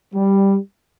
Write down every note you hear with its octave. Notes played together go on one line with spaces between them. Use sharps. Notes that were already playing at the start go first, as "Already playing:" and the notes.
G3